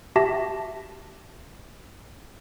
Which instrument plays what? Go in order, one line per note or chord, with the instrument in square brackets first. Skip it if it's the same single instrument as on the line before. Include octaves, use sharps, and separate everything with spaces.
[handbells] F#4 G4 E5 A5 A#6